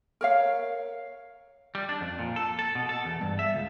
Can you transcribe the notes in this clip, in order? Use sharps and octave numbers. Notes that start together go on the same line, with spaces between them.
A#4 C#5 F5
G3
D4
F2
A#2
A4
A4
B2
A4
E2
G2
E5
C#2